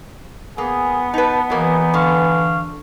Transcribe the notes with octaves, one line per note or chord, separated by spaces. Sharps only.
A#3 B3 G#4
D#4 B4 A5
E3 F#3 A#3 D#4 G#4 D#5
D3 F5 C#6